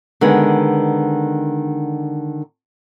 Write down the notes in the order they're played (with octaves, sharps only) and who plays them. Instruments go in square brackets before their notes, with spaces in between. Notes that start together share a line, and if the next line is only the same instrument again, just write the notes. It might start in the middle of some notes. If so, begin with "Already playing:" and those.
[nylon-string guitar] D3 D#3 G#3 B3